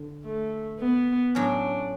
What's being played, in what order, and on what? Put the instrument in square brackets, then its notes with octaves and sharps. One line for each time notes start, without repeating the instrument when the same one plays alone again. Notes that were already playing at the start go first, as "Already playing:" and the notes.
Already playing: [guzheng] D3
[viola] A3
B3
[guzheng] A2 F#3 C#4 [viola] D4